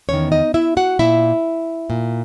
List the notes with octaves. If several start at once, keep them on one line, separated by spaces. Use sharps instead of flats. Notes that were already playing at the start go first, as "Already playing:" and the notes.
E2 D#3 C#4 C#5
D#4 D#5
E4 E5
F#4 F#5
A#2 E4 E5
A#2